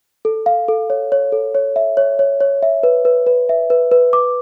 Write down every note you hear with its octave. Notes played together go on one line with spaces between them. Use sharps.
A4
F5
A4
C#5
C#5
A4
C#5
E5
C#5
C#5
C#5
E5
B4
B4
B4
E5
B4
B4
D6